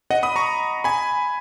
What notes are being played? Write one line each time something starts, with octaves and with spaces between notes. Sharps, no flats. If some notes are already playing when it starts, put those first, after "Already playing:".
D#5 F#5
B5 D#6
A#5 C#6
G#5 B5